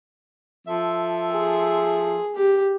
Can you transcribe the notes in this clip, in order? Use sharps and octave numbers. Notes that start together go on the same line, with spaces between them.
F3 A4 E5
G#4
G4